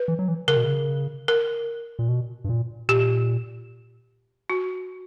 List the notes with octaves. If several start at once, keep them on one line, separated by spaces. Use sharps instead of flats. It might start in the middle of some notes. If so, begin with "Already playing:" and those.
Already playing: B4
E3
F#3
E3
C#3 A#4
B2
C#3
A#4
A#2
B2
G2
A#2
A#2 G4
F#4